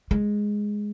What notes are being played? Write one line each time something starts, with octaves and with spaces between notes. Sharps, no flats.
G#3